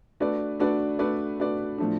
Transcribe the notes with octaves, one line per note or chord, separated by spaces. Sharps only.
A3 D4 F#4 B4 D5
A3 D4 F#4 B4 D5
A3 D4 F#4 B4 D5
A3 D4 F#4 B4 D5
A2 F3 A3 D4